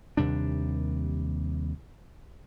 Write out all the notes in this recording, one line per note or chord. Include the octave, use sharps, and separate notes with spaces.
D#2 C3 G3 D4